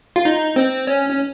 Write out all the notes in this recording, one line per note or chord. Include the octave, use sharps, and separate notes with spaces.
F4
D#4
C4
C#4
C#4